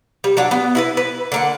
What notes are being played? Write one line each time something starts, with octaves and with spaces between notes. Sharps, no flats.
G3
F#3 D4 F#5
B3
E4 A#4 B4
B4
D3 A#3 F#5